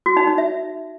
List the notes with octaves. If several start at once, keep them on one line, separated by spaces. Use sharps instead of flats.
F#4
D#4
D#4
E5